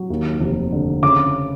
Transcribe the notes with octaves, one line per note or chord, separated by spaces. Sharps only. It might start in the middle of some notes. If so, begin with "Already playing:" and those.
Already playing: F#3
D#2
F1
D3
C#3 D6